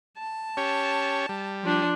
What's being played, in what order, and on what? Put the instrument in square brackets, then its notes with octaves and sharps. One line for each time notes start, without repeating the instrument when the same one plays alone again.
[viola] A5
[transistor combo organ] C#4 G4 C#5
G3
[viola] F3 D4